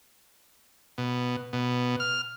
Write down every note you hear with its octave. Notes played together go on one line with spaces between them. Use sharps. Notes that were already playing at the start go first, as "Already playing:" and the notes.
B2
B2
F6